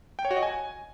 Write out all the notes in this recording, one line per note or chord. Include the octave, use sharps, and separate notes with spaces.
G5
C#5
F#4
D#5
G#5